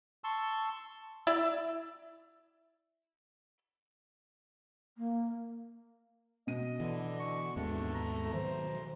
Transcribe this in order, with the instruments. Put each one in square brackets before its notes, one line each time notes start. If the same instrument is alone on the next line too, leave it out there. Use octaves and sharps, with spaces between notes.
[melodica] A5 C6 C#6 E6
[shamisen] E4 D5 E5
[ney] A#3
[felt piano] B2 D#7 [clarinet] D#5
[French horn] D3 [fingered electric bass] E3
[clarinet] C#6
[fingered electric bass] D#2 G#2 C4 [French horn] A3 [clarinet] D4
[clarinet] A#5
[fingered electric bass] D#3 F#3 [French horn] C5